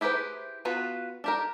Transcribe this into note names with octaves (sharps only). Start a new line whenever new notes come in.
E4 G4 G#4 B4 C5
B3 F4 F#4 B4
D4 G4 A#4